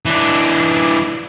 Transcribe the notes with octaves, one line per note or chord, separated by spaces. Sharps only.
E3 D4